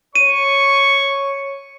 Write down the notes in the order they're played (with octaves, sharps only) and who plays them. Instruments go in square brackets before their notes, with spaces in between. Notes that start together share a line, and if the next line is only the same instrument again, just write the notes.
[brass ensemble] C#5 [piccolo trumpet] C#6 [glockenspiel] D#7